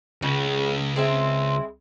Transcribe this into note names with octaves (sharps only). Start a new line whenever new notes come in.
C#2 C#3
G#3 C4 E4